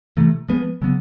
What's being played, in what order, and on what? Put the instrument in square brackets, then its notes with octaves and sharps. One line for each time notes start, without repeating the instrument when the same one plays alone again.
[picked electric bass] C3 E3 A3
F3 G#3 B3
C#3 F#3 B3